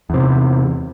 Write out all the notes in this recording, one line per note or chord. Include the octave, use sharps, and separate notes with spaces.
E2 C3